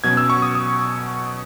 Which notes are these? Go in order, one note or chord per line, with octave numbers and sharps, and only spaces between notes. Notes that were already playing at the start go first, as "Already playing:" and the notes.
B2 F#3 C#4 G#6
E6
C#6
D#6
D#6